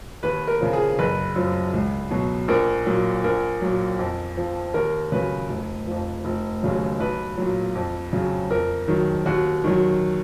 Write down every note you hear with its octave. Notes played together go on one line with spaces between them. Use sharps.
D#2 B4
A#4
C#3 F3
G#4
F#1 B4
F#2 F3
C#2
B2 F#3
A#1 A#4
A#2 F#3
A#1 A#4
A#2 F#3
F2
F3
D#2 A#4
C#3 F#3 B4
F1
F2 F3
F1
D#2 C#3 F#3
B1 B4
A#2 F#3
F2
C#3 F#3
F2 A#4
D#3 F#3
D#2 F#4
D#3 F#3